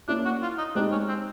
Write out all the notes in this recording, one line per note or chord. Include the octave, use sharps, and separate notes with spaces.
A#3 C#4 D4 E4
F#4
F4
D#4
G#3 C4 D4 D#4 G4 C5
C#4
C4